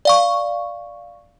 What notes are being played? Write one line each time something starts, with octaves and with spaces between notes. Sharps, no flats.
D5 F5 C#6